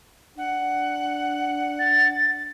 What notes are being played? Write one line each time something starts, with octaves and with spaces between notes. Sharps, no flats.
D4 F#5
A6